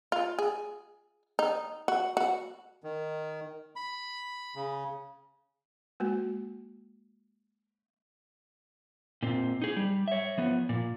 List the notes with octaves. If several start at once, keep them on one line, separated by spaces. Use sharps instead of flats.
F4
G#4
D#4
F#4
F#4
D#3
B5
C#3
G#3 A#3 F#4
A#2 C4
D#4 G#4
G3
C#5 E5
F3 B3
A#2